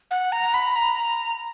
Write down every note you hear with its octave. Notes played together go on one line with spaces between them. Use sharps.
F#5
A#5
B5
A#5